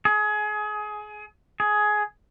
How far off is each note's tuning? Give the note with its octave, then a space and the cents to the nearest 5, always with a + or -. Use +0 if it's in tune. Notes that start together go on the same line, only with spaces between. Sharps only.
G#4 +25
G#4 +15